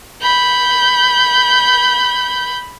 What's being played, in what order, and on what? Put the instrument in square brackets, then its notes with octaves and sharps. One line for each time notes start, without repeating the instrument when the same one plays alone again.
[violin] B5 G6